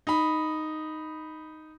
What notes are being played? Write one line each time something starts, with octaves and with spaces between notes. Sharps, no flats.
D#4 B5